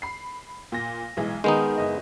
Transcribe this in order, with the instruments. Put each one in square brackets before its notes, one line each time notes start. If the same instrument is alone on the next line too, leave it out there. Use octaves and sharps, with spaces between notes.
[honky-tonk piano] B5 C7
A#2 A#6
B1 E3 G#3
[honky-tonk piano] D#3 [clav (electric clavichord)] G#3 B3 D#4
[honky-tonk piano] F#1 D#5